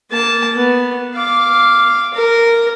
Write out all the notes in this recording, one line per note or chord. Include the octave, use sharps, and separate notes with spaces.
A#3 A5
B3
F5 D6
A#4